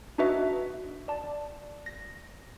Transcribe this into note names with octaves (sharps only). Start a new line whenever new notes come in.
D4 D#4 F#4 B4 D#5 E5
D5 A5
A#6